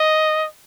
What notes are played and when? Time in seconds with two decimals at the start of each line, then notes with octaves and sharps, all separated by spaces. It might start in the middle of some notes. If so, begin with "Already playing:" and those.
Already playing: D#5